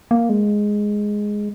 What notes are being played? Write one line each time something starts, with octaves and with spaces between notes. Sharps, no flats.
A#3
G#3